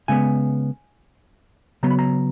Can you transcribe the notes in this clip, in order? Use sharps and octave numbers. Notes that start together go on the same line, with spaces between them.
C#3 G#3 B3 G#5
C#3 F#3 B3 A#5
B5
A#5